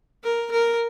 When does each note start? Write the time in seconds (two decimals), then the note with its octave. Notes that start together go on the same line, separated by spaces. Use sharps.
0.23 A#4
0.51 A#4